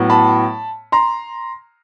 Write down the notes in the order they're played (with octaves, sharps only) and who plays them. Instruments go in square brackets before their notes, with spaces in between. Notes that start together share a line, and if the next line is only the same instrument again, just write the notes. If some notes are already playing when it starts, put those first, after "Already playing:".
Already playing: [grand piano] A2 F#3 B3
A5 B5
A#5 C6